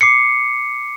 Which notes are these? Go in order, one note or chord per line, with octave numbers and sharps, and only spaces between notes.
D6 C7 C#7